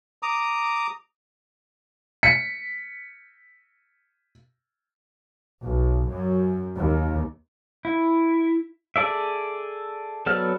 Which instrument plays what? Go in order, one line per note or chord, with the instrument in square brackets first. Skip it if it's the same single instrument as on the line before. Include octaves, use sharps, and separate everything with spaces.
[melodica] A#5 D6 D#6
[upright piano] B6 C#7
[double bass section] B1
F#2
D#2
[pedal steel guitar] E4
G#4 A4 D5 E5
F#3 B3 A4 D5 F6